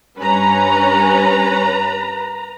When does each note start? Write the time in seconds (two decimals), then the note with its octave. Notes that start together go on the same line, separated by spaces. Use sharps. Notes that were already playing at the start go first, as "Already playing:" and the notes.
0.18 G2 C#4 B4 A#5